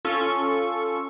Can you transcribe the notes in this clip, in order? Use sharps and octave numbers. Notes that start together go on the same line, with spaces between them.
C#4 F4 A4 C#6